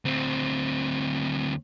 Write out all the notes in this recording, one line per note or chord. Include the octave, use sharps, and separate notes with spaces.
D2 C4